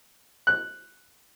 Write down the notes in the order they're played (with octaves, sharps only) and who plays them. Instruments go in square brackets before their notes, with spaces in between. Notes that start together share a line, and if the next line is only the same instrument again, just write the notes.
[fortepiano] F#6